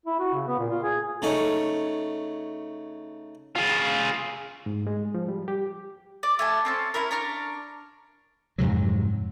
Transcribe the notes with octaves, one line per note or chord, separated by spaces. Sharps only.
E4
F#4
C#3
B3
A#2
F4
G#4
C#3 A3 D#4 C#5
F4 G#4
G#2
G#3
F3
G3
G4
D5
A3 G#5 A5
C4 C#4 A5
C#4 D4 E4 A#4
D4 A#5 C#6 F6
F2 G#2 C3 F#3